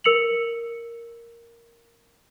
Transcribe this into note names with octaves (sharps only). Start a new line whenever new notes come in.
A#4 E6 C#7 F7 F#7